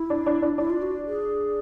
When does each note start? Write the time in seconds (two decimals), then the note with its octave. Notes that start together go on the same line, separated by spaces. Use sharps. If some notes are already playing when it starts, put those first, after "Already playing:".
Already playing: E4
0.10 D4
0.26 D4
0.42 D4
0.58 D4 E4
0.70 F4
0.82 F#4
1.06 G#4